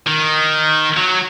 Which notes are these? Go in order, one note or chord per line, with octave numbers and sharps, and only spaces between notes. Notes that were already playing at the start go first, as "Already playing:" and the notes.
D#3
F#3